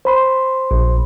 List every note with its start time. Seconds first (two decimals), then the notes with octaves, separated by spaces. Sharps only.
0.05 C5 B5 C6
0.71 A#1